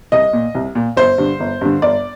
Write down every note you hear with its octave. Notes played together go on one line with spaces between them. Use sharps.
C2 D#5
A#2
C2
A#2
G1 C5
G2 D3
G1
G2 D3
G1 D5